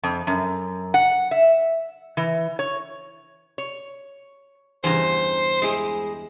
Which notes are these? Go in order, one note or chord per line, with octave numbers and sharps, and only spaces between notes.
F2
F#2
F#5
E5
E3
C#5
C#5
E2 G2 C#3 C5 G#5 A#5
G#3 E4 G#4